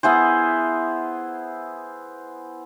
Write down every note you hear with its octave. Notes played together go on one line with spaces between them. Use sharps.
B3 E4 G#4 C5